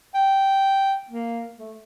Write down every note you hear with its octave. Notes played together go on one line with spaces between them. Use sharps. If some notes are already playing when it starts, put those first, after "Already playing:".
G5
A#3
A3